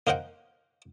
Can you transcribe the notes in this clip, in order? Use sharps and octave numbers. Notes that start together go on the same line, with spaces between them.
A#3 D#4 A#4 C5 F#5 G5